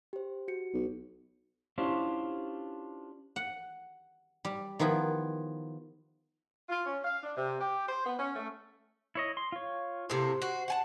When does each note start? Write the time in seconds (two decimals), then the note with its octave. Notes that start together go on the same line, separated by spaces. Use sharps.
0.13 G4 C5
0.48 F#4 C#7
0.74 B1
1.78 C#4 D4 E4 F4 G4 C5
3.36 F#5
4.45 G3
4.79 D#3 F3 B3 E4
6.69 F4
6.86 C#4
7.04 F5
7.23 D4
7.37 C3
7.61 G4
7.88 C5
8.06 B3
8.19 C#4
8.36 A3
9.15 E4 C#5 D#5
9.37 C6
9.52 F4 C#5
10.10 A2 C3 A#3 C5
10.42 F#4
10.68 F#5 G#5 A5